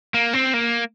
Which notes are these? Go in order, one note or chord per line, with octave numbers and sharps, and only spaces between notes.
A#3
C4
A#3